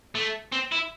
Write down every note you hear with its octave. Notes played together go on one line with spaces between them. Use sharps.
A3
C4
E4